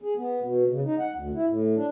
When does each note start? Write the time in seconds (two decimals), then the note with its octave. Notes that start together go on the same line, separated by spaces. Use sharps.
0.02 G#4
0.16 B3
0.41 B2
0.70 C#3
0.85 D#4
0.99 F#5
1.16 D2
1.35 E4
1.47 A2
1.76 D4